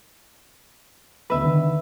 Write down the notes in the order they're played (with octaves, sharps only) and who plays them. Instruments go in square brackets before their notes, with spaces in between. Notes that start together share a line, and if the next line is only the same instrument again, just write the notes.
[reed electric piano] D2 B3 B5 [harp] B4 E5
[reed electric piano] D3 D#3